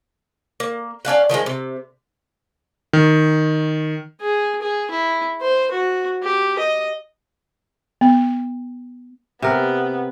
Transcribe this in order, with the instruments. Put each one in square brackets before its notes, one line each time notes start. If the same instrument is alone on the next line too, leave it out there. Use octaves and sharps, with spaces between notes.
[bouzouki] A#3
C#4 D4 F5 F#5
D#3 F3 F#3 G#3
C3
[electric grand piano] D#3
[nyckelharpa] G#4
G#4
E4
C5
F#4
G4
D#5
[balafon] B3
[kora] C3 A#4 [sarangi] B3